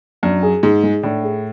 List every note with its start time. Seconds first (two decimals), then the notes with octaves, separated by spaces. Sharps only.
0.23 F#2 D4
0.43 G#4
0.63 G#2 G#3
0.83 G#3
1.03 A2 D4
1.23 G#4